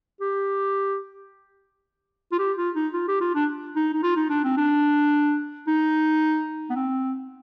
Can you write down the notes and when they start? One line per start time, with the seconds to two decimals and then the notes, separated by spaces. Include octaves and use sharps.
0.21 G4
2.32 F4
2.39 G4
2.57 F4
2.75 D#4
2.94 F4
3.08 G4
3.21 F4
3.35 D4
3.76 D#4
3.94 D#4
4.03 F4
4.16 D#4
4.30 D4
4.44 C4
4.57 D4
5.67 D#4
6.70 B3
6.75 C4